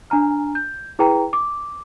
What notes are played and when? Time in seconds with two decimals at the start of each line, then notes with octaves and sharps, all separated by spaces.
0.10 D4 G#5 A#5 F6
0.55 G6
0.99 E4 G#4 B4 G5 A#5
1.33 D6